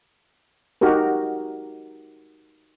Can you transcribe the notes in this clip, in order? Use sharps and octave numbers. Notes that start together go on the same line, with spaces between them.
D#4 F#4 G4 A#4